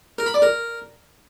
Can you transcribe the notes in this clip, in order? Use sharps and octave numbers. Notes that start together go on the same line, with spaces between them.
A#4
B5
D5
A#4